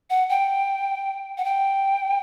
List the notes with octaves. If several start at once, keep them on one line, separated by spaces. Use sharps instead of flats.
F#5
G5
F#5
G5